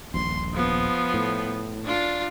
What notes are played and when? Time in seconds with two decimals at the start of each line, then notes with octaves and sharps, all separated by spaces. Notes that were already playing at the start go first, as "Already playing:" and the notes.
0.14 D#1 A#1 C6
0.53 F3 B3
1.14 A2
1.84 D4 F4